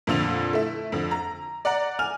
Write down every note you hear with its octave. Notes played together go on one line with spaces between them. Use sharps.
F2 A#2 D3 F7
A3 E4
F2 D3
A#5
D5 F#5 A#5
G#5 F6 F7